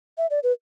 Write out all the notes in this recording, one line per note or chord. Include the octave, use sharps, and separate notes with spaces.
E5
D5
B4